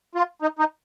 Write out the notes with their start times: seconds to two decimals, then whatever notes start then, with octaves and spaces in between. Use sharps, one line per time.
0.15 F4
0.42 D#4
0.59 D#4